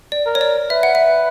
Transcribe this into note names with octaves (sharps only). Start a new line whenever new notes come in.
D5
A#4
C#5
D5
B4 E5
F#5
E5